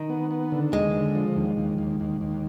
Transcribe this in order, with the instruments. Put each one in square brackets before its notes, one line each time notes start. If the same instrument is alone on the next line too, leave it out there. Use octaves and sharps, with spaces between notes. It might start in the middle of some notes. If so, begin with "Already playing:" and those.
Already playing: [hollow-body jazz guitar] D#3
[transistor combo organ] B3
B3
D3
[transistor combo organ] D#2 [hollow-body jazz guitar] G#3
[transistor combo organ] D3
F3
D#2
D#2
D#2
D#2
D#2